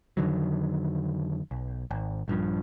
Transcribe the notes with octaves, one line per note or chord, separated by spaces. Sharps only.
F2 D3 D#3 F#3
B1
G#1
A#1 G2 F3